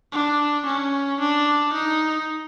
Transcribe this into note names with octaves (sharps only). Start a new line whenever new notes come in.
D4
C#4
D4
D#4